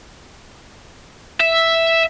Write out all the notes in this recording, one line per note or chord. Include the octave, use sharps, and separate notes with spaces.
E5